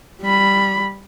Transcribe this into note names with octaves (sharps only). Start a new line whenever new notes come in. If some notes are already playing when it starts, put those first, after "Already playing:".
G3 B5